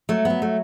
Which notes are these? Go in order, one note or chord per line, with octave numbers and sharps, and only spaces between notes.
F#3 A3
F#3 B3
A3